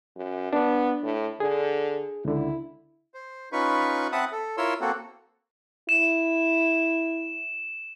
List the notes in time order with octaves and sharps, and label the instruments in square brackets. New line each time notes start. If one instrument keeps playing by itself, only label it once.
[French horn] F#2
[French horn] B3 [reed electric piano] D4
[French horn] A2
[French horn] D3 [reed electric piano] G#4
[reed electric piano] C#2 D3 [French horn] E4
[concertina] C5
C#4 D#4 F4 B4 B5 C#6
C4 E5 F#5 A5 B5 D#6
A4
E4 F4 A#4 C#5 C6 E6
A#3 C4 F#4 A4
[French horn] E4 [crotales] E7